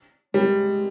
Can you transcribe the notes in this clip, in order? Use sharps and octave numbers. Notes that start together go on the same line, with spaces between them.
G3 G#3